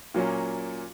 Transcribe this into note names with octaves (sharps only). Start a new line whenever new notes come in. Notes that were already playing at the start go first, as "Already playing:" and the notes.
A#2 F#3 A#3 C#4